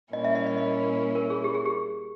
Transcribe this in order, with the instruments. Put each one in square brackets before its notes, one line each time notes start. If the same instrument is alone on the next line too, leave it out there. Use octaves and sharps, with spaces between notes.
[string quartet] A#2 G3 A#3 C#4 E4 [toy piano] D#5
[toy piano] E5
D#5
D#5
D#5
A#4
G#4
G4
G#4
G4